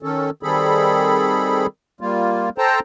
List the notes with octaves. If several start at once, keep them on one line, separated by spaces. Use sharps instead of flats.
D#3 C#4 A4
D#3 G3 C4 G#4 A4 B5
G3 A#3 F4
A4 C5 G5 A5 A#5